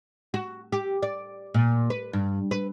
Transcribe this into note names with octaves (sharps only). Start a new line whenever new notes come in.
F#4
G4
D5
A#2
B4
G2
B4